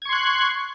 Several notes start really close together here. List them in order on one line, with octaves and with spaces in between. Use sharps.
G#6 C#6 C6 F#6